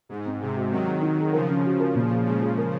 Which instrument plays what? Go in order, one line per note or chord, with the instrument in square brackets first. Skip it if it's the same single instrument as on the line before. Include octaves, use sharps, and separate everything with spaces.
[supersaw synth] G#2 [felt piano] G#3
[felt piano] C4
[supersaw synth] C3 [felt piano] G#3
[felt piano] F#4
[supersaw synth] D#3 F#3 [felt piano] C4
[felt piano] G#4
D#4
G#4
[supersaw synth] C#3 F3 [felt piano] A#4
[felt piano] C#4
F#4
A#4
A#2
G#4
[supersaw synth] C#3 F3 [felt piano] G#3
[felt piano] G#4
A#4